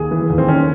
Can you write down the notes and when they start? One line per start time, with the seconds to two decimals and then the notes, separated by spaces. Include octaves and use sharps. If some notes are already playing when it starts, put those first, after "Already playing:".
Already playing: D#2 G#4
0.11 E3
0.30 D#2
0.38 C4
0.48 D#3 C#4